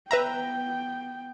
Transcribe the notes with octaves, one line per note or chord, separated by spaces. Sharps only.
B3 B4 E5 G5 A#5